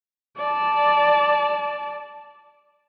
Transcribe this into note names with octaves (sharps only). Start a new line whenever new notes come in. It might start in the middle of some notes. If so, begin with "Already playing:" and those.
D5 A5